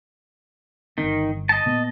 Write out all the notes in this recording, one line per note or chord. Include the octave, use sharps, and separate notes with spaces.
G1 D#3 C4
D#5 A5
A#2 B3